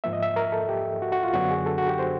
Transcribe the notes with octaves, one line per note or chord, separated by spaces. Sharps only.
G#2 F3 A#3 E5
D#5
E5
A#4
A4
G4
F#4
F#4
F4
F#2 D3 F#3 B3 D4 F#4
G#4
A4
F#4
G4
C5